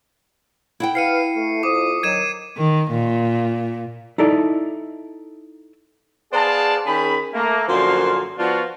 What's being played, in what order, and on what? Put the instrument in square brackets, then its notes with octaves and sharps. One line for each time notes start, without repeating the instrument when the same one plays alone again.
[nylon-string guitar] E4 F#5 G5
[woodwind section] B4 F5 [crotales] C7 C#7 D#7
[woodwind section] A3
[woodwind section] F2 D#6 [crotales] D6
[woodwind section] D#3 F#3 [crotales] G#6 D#7 E7
[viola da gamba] D#3
A#2
[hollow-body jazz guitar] D#4 E4 A4 D5
[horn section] B3 G#4 C5 D5 F5 A5
D#3 C#4 G#4 B5
A3 A#3
F#2 D3 F3 A#3 C5 C6
F3 B3 D4 F4 F#4